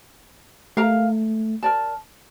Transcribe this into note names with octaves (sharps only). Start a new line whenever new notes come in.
A3 A#4 F5 A#5
A#4 D5 A5